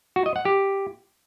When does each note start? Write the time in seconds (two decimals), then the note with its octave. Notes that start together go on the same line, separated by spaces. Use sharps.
0.16 F#4
0.26 D#5
0.36 F#5
0.45 G4